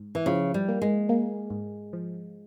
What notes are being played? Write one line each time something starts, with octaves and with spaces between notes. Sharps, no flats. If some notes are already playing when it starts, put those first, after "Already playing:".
Already playing: G#2
E3
C#3 F3
G3
A#3
G#3
A#3
G#2
F3